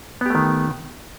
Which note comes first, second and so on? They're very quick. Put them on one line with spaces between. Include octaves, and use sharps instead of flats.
B3 G4 A3 D#3